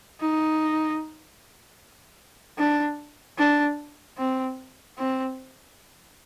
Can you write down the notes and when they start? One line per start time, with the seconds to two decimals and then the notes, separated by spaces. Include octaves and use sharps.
0.21 D#4
2.58 D4
3.38 D4
4.18 C4
4.98 C4